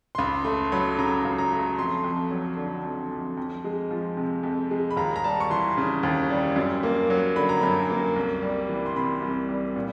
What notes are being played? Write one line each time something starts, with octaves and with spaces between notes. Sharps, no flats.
C6
C#2 B5
A3 C6
F#3 B5
C#3 A#5
C#2
A#5
A3
F2 C6
F2
F#3
D3
F2
F2
F2
G#3
F3
C3
F2
G#3
B5
D#2 A#5
A#5
G3 A5
C#6
E3 C6
C#3
D#2
G3
F#2
A#3
F#3
D3 B5
A#5
F#2 B5
A#3
C2
G3
E3
C6
C3 B5
C2
G3
A#2